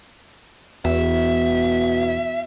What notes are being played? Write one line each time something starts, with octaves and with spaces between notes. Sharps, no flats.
E2 B2 E5